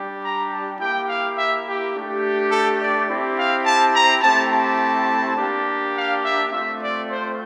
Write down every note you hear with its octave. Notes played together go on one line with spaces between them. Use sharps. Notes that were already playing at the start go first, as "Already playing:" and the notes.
Already playing: G3 D4 G4
A#5
A5
A#3 E4 G4 G5
F5
E5
G4
A3 D4 G4
A4
D5
C4 E4 G4
F5
A5
A#5
A3 C4 E4 G4 A5
A5
A#3 D4 G4
F5
E5
A3 C4 F4 E5
D5
C5